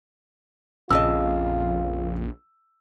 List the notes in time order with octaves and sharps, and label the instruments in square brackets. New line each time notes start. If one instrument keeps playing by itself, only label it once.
[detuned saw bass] A#1 [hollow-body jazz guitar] F2 C#3 D#5 [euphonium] F4 [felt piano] E6